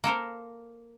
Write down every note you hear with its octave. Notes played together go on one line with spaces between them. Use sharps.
A#3 A4 A#4 C5